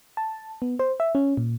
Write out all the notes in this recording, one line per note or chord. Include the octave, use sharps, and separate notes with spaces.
A5
B3
C5
E5
C#4
A#2